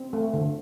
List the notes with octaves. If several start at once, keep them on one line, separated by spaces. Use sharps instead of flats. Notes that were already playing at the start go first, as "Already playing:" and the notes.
Already playing: C4
A3
D3